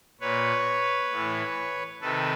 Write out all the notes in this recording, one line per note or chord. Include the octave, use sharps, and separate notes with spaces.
A#2 B4 C#5
A2 E3
C3 D#3 A4 B4